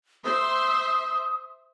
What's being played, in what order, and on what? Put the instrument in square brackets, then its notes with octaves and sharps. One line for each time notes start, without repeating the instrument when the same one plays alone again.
[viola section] C5 E5 C6 [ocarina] D#6